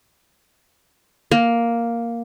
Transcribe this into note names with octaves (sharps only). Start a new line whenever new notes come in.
A#3